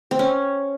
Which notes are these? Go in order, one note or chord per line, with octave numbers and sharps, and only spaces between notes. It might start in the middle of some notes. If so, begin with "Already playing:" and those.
C4
C#4